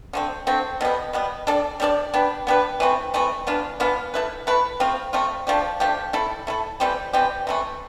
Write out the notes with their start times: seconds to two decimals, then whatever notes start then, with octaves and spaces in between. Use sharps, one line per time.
0.13 D3 A3 C4
0.47 D3 A3 C4
0.81 B2 G3 B3
1.13 B2 G3 B3
1.47 G3 D4 A4 D5
1.80 G3 D4 A4 D5
2.14 B3 D4 G4 B4
2.47 B3 D4 G4 B4
2.80 E3 A3 C4
3.14 E3 A3 C4
3.47 E3 B3 D4 F4
3.80 E3 B3 D4 F4
4.14 A3 E4 B4
4.47 A3 E4 B4
4.80 A3 C4 F4
5.13 A3 C4 F4
5.47 F3 A3 D4 G4
5.80 F3 A3 D4 G4
6.13 A3 E4 A4
6.47 A3 E4 A4
6.80 E3 G3 C4 G4
7.13 E3 G3 C4 G4
7.47 C3 E3 A3